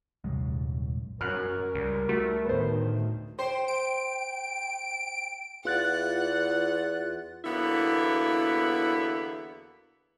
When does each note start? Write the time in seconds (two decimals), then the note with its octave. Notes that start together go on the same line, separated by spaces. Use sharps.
0.24 D#1 C2 F#2 G#3
1.21 F#2 F#3 C#4 A#4 F6 F#6
1.75 C#2 G3
2.09 A3 F#4
2.45 D2 A2 D#3 B3 C5
3.39 C5 G5
3.68 G5 D7
5.65 E2 F4 F#5 F#6 A6
7.45 E2 D3 F#3 A#3 B3 E4